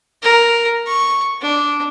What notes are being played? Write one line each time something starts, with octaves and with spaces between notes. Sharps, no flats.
A#4
C#6
D4